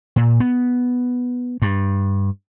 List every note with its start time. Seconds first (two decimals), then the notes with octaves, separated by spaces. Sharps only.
0.16 A#2
0.40 B3
1.62 G2